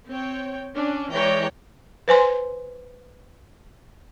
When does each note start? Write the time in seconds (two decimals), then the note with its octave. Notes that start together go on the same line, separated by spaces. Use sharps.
0.11 C4 C#5 G5
0.75 C#4 D4
1.13 E3 G#3 C#5 D5 G5 A#5
2.08 B4 C5 G#5 C6